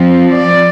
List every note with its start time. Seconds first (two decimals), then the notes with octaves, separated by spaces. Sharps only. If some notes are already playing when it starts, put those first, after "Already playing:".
Already playing: F3 C4
0.32 D5